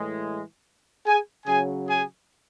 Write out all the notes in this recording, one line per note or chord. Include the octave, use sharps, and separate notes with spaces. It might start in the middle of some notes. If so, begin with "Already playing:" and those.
Already playing: A2 E3 G#3
G#4 G#5
C#3 F#3 G#4 G#5
G#4 G#5